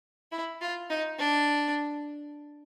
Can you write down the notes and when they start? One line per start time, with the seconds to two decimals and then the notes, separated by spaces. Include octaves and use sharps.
0.32 E4
0.61 F4
0.90 D#4
1.18 D4